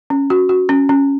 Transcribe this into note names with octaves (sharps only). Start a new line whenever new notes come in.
C#4
F#4
F#4
C#4
C#4